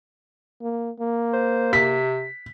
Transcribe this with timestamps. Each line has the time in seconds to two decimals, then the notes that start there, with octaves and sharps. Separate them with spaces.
0.62 A#3
1.00 A#3
1.33 C5
1.73 C3 B6